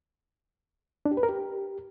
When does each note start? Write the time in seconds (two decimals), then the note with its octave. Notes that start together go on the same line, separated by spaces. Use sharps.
1.05 D4
1.11 G4
1.17 B4
1.23 A#4
1.29 G4